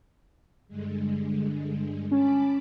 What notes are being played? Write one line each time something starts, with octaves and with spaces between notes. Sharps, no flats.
G2 D3 G#3
C#4 A5 B5 D6